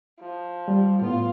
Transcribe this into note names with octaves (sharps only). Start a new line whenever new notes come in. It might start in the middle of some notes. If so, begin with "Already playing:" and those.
F3
G3
A2 B3 F4